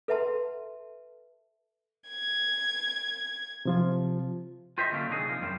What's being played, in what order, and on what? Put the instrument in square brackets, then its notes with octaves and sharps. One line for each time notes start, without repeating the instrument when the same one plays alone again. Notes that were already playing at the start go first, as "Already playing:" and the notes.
[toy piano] A4 B4 E5 F#5 A5 C6
[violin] G#6
[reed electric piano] C3 F3 F4
[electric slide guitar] F4 G4 C5 D#5 E5
D3 F#3 A3 A#3 C#4
C3 D#3 F#3 D4 D#4 G#4
F3 A#3
F#2 G3 F4 G4 C5